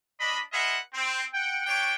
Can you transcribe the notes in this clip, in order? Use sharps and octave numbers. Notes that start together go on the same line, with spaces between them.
D4 D#5 B5
F4 G#4 B4 D#5 E5 F#5
C4
F#5 G5
A3 D4 F#4 C#5 G5